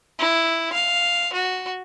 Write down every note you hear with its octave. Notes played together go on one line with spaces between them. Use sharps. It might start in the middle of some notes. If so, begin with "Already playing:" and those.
E4
F5
F#4